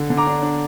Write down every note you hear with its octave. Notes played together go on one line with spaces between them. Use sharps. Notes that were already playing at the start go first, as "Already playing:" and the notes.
Already playing: D3
D3
A#5 D6
D4
D4